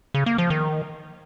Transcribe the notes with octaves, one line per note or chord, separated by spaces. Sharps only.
C#3
A#3
F3
D#3